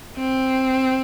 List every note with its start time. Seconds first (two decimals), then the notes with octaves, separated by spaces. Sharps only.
0.17 C4